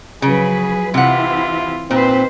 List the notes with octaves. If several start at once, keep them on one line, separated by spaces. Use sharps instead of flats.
C#3 F3 F#3 G#4 B4
C3 E3 C4 E4 F4 F#5
A#2 C4 D#4 B4 C5